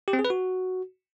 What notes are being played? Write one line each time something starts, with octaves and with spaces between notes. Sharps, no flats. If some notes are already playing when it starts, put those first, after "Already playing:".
G4
C4
G#4
B4
F#4